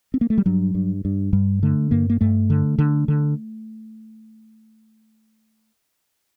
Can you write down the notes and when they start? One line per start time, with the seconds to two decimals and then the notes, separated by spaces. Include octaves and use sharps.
0.14 C4
0.21 A#3
0.30 A3
0.38 G3
0.46 G2 F#3
0.75 G2
1.05 G2
1.33 G2 G3
1.63 D3 A3
1.91 G2 A#3
2.10 A#3
2.21 G2 A3
2.50 D3
2.78 D3
3.08 D3